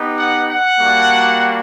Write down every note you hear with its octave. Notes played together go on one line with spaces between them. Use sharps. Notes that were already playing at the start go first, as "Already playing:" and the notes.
Already playing: B3 D#4 G4
F#5
F#5
G3 A#3 D4 F#4